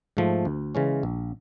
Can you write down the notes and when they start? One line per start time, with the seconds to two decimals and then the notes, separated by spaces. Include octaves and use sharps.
0.17 G#2 F3 A3
0.45 D2
0.75 C#3 E3 G#3 C#4
1.03 A#1